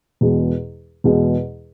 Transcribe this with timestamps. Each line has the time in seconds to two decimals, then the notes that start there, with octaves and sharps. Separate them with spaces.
0.21 E2 B2 G#3
1.04 E2 B2 G#3